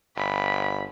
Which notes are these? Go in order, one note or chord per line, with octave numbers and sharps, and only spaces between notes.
G1 B5